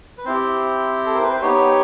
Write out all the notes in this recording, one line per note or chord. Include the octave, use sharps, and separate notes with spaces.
B4
C4 E4 G4 C5
A4
A#4
B4
C5
B3 D#4 G4 C#5